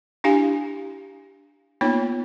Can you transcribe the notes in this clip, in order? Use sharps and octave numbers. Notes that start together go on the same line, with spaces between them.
D4 E4 G4 F5 G#5
A#3 B3 D#4 F4 C#5